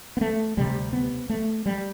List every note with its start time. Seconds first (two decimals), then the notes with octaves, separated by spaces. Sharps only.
0.17 B3
0.21 A3
0.57 D2 C3 G3
0.93 B3
1.30 A3
1.66 G3